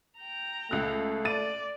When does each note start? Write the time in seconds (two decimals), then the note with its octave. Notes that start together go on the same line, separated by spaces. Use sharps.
0.19 G5 A#5
0.71 C#2 A3 F#6
1.25 D5 A6 D#7